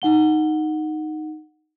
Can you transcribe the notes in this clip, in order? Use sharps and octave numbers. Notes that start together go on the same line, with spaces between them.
D#4 F#5 G7